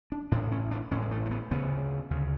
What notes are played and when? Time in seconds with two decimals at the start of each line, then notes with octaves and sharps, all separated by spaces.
0.12 D4
0.32 A1 A2 D4
0.52 C#4
0.71 D4
0.91 A1 A2 C#4
1.02 G#3
1.11 A3
1.26 A3
1.31 B3
1.51 D2 C#3 B3
2.11 D2 C#3